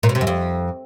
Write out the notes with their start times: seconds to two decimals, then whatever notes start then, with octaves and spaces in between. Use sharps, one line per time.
0.03 A#2
0.09 B2
0.15 C3
0.21 F#2
0.27 F2